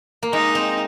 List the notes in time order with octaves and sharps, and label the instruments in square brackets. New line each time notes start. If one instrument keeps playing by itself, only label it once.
[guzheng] A#3
[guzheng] G#3 [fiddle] D#4
[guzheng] C4